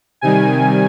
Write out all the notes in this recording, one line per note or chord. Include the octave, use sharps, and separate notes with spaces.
C3 D#3 G3 G#5